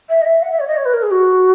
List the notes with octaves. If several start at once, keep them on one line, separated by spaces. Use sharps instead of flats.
E5
D#5
E5
F#5
E5
C#5
D#5
C#5
B4
A#4
G#4
F#4